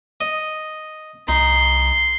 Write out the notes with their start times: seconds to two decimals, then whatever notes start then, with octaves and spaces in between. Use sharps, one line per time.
0.21 D#5
1.28 C2 D#4 C6